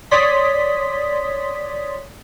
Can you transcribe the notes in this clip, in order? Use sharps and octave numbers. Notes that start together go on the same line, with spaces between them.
C#5 D5 C6 D#6 B6